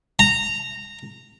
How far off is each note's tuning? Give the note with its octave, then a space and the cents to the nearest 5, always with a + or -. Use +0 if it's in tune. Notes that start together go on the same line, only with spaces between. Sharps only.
A#5 -15